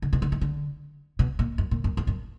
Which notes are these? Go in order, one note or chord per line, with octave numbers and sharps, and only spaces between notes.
D3
B2
D3
D#3
D3
B2
A#2
F#2
A#2
F#2
F2
F#2